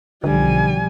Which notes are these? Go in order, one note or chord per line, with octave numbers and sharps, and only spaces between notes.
B1 D3 F3 G3 G#5